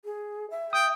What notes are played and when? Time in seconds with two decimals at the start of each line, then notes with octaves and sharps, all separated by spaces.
0.05 G#4
0.50 E5
0.73 G5 D#6